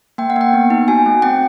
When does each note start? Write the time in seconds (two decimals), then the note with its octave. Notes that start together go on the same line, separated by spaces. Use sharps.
0.18 A#3 G5
0.30 F#5
0.36 A#3 G5
0.53 B3
0.70 D#4
0.88 F#4 G#5
1.06 A3
1.22 C4 G5